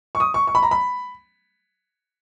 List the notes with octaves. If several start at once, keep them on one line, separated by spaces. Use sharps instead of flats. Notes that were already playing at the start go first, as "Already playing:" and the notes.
C#6
D#6
C#6
C#6
B5
A#5
B5